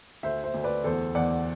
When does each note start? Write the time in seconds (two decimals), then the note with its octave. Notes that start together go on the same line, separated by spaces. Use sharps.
0.23 D2 C5 E5
0.44 C5 E5
0.54 D2
0.64 B4 D5
0.84 E2 A4 C5
1.15 E2 D5 F#5